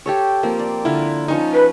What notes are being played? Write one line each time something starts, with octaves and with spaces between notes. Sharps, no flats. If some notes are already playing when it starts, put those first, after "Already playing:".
G4 A4 C#5
F3 A#3 C4
D5
D3 E4 F4 A#4
F3 C#4 D#4 C#6
B4